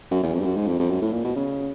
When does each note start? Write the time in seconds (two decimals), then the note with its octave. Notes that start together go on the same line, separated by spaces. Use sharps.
0.11 F#2
0.23 E2
0.34 F2
0.41 G2
0.45 F#2
0.56 G#2
0.68 F2
0.79 F2
0.90 F#2
1.02 A2
1.13 A#2
1.24 B2
1.36 C#3